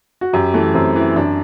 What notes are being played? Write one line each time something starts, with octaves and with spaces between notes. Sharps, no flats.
F#4
F#2 G4
E3 A3
F#2 C4
E3
F#2 D4